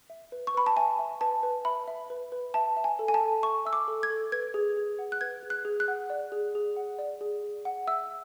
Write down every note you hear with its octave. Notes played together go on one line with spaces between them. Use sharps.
E5
B4
C#6
B4 B5
A5
E5 G#5
E5
B4 A5
B4
E5 B5
E5
B4
B4
E5 A5
E5
G#5
A4
G#5
A5
A4
E5 C#6
E5 E6
D6
A4
G#6
A4
B4 G#6
G#4
G#4
F#5
F#6
B4 G#6
G#4
F#6
G#4
F#6
F#5
D5
G#4
G#4
F#5
D5
G#4
G#4
F#5
E5 E6